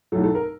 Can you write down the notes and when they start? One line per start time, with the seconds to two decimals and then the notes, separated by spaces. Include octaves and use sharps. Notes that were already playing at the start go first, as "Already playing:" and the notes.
0.12 B1 A2 F#3 A4
0.23 A4
0.35 A#4